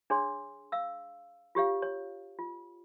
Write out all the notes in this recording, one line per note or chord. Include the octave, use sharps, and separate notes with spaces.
D4 G#4 C#5 C6
F5 E6
F4 G4 C#5 F5
C#5
F4